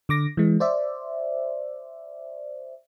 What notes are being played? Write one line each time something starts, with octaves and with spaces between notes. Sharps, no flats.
D3 D6 A#6
E3 G#3
C5 D5 E5